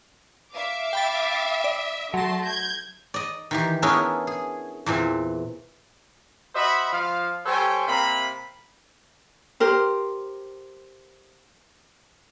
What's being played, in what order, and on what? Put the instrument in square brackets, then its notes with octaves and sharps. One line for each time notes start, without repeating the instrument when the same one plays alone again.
[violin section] E5 F5 D6
[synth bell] G5 B5 A6
D5
[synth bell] F#3 A#6 [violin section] A3 A5 C6
[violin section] G6 G#6
[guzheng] D5 D#5
D#3 E3 G4
B3 C#4 D4 E4 G#4 A#4
G#4
E2 A#2 E3 C4
[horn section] F#4 C5 D#5 E5 B5
F3 F5
G3 A4 C5 C#5 G5 G#5
C3 A#3 B5
[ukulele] G4 A#4 C5